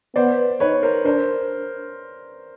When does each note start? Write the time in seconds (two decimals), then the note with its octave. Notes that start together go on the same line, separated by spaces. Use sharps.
0.16 B3 C5 D5
0.60 D#4 B4 C#5
0.83 A#4 C5
1.05 D4 A#4 C5